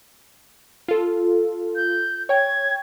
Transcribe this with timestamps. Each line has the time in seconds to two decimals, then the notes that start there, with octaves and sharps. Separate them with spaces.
0.88 F4 A4
1.76 G6
2.29 C#5 G5 G#6